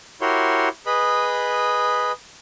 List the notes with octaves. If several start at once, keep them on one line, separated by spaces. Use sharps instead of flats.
E4 F#4 G4 A#4 C#5 C6
G#4 B4 D#5 B5